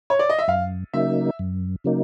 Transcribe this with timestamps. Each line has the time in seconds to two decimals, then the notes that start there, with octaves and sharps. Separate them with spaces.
0.10 C#5
0.19 D5
0.30 D#5
0.39 E5
0.48 F#2 F5
0.94 C#3 F#3 A#3 D#4 E5
1.39 F#2
1.84 C#3 F#3 A#3 D#4